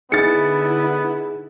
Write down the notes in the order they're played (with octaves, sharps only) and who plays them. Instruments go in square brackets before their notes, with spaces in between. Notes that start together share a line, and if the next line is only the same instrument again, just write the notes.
[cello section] D3 E4 [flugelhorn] B3 [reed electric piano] D#4 G#4 [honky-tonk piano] A6 C#7